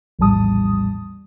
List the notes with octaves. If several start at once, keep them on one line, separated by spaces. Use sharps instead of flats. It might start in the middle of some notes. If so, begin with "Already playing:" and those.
A#1 E2 A2 G3 A5 D#6